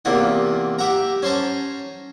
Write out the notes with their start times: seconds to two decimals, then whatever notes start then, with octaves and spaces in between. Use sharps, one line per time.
0.05 E2 C3 A#3 F4 F#5
0.79 G4 E5 F#5 A#5
1.22 C#4 C5 C#5 A5 A#5